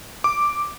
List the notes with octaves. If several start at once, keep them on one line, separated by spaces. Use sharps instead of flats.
D6